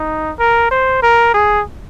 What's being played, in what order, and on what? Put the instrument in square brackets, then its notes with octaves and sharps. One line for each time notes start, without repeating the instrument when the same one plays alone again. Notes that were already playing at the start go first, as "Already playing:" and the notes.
Already playing: [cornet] D#4
A#4
C5
A#4
G#4